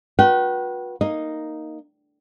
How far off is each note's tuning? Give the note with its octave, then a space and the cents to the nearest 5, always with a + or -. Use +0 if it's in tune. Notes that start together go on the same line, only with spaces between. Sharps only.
F#4 -40 B4 -30 G5 -40
A#3 +0 D#4 +0 D#5 +0